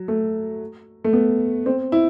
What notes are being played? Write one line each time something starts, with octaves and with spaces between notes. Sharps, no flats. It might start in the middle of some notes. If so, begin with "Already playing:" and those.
Already playing: F#3
A3
A3
B3
C4
E4